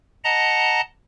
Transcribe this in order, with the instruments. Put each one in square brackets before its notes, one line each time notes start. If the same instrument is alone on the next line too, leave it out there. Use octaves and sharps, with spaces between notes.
[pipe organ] D#5 F#5 A5 A#5